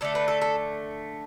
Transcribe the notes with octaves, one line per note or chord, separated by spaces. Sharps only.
D3 A3 A4
B4
A4
A4